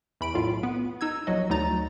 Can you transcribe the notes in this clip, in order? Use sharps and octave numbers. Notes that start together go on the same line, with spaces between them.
E2 B5 D7
B1 A2 F4
B3
D#4 E6 G#6
A#1 F#3 D#5
D2 F#3 D#4 A#5 A6